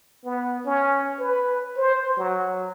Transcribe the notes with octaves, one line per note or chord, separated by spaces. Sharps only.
B3
C#4
B4
C5
F#3